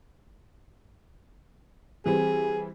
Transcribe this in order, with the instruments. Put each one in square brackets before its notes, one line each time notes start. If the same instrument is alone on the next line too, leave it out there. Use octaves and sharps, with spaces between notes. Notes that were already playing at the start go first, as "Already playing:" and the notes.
[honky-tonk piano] E3 G3 C4 [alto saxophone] G#4